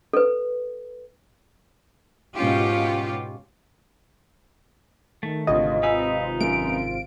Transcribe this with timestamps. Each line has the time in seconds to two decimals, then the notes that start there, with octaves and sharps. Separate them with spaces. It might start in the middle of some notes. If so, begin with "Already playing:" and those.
0.13 A4 B4
2.35 G#2 B2 C#4 F4 G4
5.23 D#3 A3
5.47 G#1 D2 C3 F4 D#5
5.83 D#4 B4 G#5 E6
6.41 F#2 D7